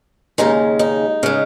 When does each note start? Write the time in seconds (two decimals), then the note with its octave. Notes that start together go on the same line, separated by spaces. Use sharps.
0.38 D#2 C#3 G#3 D#4
0.79 D#4
1.23 C#3 G#3